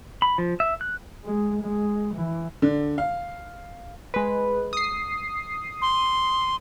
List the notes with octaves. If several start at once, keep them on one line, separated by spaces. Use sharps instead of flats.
B5
F3
E5
F#6
G#3
G#3
E3
D3
F5
G#3 B4
D#6 C7
C6